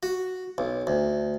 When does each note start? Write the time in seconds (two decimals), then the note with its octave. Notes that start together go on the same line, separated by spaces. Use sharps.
0.03 F#4
0.58 B1
0.87 D2